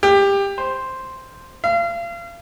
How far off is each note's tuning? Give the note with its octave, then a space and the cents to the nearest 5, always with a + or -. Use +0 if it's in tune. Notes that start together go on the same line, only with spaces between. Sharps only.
G4 +20
C5 +0
F5 -35